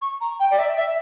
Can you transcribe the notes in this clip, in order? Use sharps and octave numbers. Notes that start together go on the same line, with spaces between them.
C#6
A#5
G5
D5
E5
E5